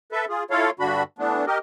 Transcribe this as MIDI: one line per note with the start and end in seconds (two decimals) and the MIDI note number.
0.12 0.25 69
0.12 0.25 71
0.12 0.25 76
0.29 0.43 65
0.29 0.43 68
0.50 0.70 64
0.50 0.70 65
0.50 0.70 69
0.50 0.70 73
0.50 0.70 77
0.80 1.03 43
0.80 1.03 50
0.80 1.03 62
0.80 1.03 66
0.80 1.03 83
1.19 1.45 52
1.19 1.45 57
1.19 1.45 59
1.19 1.45 62
1.47 1.58 67
1.47 1.58 70
1.47 1.58 75